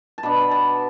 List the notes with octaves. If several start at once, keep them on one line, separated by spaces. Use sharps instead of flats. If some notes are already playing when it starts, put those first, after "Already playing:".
A5
B2 B3 D4 B5
B5
A5